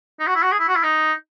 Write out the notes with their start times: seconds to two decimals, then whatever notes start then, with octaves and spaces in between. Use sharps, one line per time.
0.20 D#4
0.27 F#4
0.35 E4
0.43 F#4
0.52 G#4
0.59 E4
0.68 F#4
0.76 E4
0.83 D#4